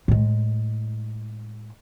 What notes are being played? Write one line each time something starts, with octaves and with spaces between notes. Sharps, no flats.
A2 G#3